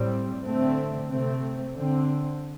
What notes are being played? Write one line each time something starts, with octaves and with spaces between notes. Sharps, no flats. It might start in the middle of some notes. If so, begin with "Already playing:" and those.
Already playing: A2 G3 C4
D3 A3 C4
C3 A3 C4
D3 C4